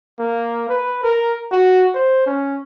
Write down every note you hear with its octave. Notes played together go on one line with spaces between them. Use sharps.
A#3
B4
A#4
F#4
C5
C#4